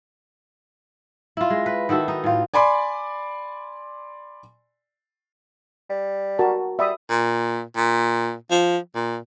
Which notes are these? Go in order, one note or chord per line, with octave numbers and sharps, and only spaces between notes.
E4 F4
G#3
B4
D#3 E4 F#4 A4
D#4
A2 F4
D5 G#5 B5 C6 D6
G3
F#4 A#4 A5
G3 E5 B5 D#6
A#2
A#2
F3
A#2